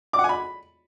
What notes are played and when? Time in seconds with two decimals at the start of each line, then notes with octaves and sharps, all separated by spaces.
0.13 D6
0.19 F#5
0.24 G#5
0.29 B5